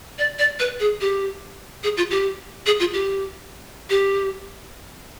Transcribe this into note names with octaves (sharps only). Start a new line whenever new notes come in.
D5
D5
B4
G#4
G4
G#4
F4
G4
G#4
F4
G4
G4